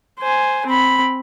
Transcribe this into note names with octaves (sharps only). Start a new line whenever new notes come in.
C5 G#5
C4 B5